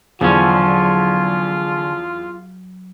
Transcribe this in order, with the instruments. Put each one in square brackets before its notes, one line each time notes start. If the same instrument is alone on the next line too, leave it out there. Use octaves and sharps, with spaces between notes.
[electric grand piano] E2 [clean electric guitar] D3 F3 C#4 [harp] F#3 [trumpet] F4